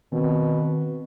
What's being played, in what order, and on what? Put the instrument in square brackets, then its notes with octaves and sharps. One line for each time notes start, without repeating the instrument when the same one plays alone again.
[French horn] B2 [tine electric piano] D#3 C4